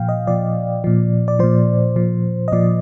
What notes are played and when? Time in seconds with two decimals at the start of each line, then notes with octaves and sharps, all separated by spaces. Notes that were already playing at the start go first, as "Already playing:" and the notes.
Already playing: A#2 F3 F5 G5
0.09 D#5
0.27 A#2 F3 D5
0.84 A#2 F3
1.28 D5
1.39 A#2 F3 C5
1.96 A#2 F3
2.48 D#5
2.52 A#2 F3 D5